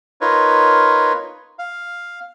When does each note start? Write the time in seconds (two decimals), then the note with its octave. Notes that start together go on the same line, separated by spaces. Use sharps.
0.21 D#4 F4 A#4 B4 C#5
1.59 F5